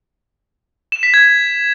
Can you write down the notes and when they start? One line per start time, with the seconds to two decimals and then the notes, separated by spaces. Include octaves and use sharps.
0.92 E7
1.03 B6
1.14 G#6